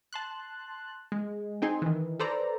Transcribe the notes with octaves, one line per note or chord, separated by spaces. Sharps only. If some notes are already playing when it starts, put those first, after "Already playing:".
A5 C6 F#6
G#3
C4 D#4 G#4 C6
D#3 E3
A4 B4 C5 D5 A#5